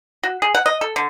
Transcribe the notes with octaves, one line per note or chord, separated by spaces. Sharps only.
F#4
G#4
F#5
D#5
A4
D3